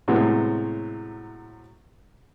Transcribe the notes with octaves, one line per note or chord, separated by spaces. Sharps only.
A2 C3 F#3 G#3 B3